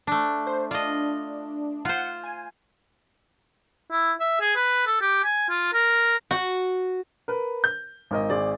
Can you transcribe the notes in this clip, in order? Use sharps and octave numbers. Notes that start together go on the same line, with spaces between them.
A3 D4
C5
D4 F4 D#5
F4 C5 F#5
G#5
E4
E5
G#4
B4
A4
G4
G#5
F4
A#4
F#4
A#4 B4
G6
G#1 A#4 D#5
G#1 G#4 D5